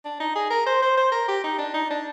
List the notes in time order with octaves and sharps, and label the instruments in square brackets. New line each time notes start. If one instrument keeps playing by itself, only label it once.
[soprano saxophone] D4
D#4
G#4
A#4
C5
C5
C5
A#4
G4
D#4
D4
D#4
D4